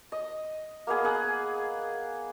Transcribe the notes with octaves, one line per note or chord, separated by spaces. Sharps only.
D#5
A#3 B3 G#4
G#4 F#5